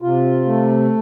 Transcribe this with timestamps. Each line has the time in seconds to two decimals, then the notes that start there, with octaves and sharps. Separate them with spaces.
0.02 C3 F4
0.45 A3